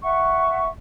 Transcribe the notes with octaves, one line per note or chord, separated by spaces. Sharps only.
E5 F#5 C#6